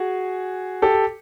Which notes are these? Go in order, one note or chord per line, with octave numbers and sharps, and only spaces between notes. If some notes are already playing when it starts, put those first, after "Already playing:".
Already playing: F#4 G#4
G4 A4